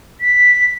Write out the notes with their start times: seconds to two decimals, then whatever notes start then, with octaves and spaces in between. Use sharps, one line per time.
0.21 B6